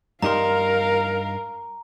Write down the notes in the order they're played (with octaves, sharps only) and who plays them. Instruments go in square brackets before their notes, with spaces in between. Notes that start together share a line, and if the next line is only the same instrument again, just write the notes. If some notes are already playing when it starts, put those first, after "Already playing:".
[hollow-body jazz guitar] G2 D#4 C6 [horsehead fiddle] A#4 F5 [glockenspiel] A#5